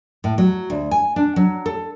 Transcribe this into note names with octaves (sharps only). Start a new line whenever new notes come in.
A2
F#3
D2
G#5
D4
F#3
A4